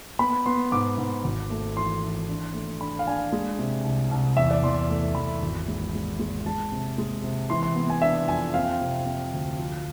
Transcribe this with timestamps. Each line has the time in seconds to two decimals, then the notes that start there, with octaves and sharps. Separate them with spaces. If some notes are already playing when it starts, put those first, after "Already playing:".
0.19 B3 B5
0.46 B3 C6
0.72 G#2 D6
0.98 G#2
1.24 G#1
1.50 A3
1.76 E3 C6
2.02 E3
2.29 D4
2.54 A3
2.80 D4 B5
2.99 F5
3.07 D4 G#5
3.32 G#3
3.59 C3
3.84 C2
4.11 C2
4.36 E2 E5
4.51 D5
4.63 E2 C6
4.89 A3
5.15 E2 B5
5.42 G#1
5.68 G#3
5.94 G#3
6.19 G#3
6.46 G#3 A5
6.72 C3
6.98 G#3
7.24 C3
7.50 E3 C6
7.63 C6
7.75 B3
7.90 G#5
8.02 D4 E5
8.28 F2 G#5
8.54 C4 F5
8.81 C3
9.06 C4
9.33 D2
9.59 F3